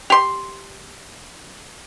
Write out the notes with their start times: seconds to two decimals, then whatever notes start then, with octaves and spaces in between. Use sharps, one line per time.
0.10 G4 C6